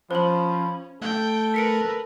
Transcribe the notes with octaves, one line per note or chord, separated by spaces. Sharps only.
F3 C#4 C5 B5 F#7
A3 A4 G5
A#4 B4 B6 C#7 D7